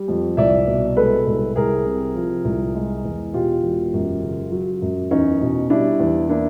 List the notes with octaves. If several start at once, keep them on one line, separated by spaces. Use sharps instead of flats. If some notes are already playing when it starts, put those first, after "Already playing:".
Already playing: G3
F2
C2 D5 E5
B2
G#3 A4 B4
C2
C2 G#4 A#4
C3
F3
C2
G#3
E2
B2 F4 G4
E1
F#2
C#3
F#3
F#2
E2 C#4 D#4
B2
G3 D4 E4
E2
A#3 D4 E4